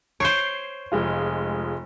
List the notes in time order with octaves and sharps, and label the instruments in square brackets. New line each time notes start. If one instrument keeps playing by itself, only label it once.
[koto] C5 C#5 [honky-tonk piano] G6 C7 D7
[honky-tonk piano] F1 G#3 F4